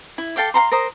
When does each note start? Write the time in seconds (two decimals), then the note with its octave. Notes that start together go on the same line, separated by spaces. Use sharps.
0.18 E4
0.36 A4 F5 G5 D6
0.54 F5 F#5 A#5 C6
0.71 A#4 C5 A#5 D#6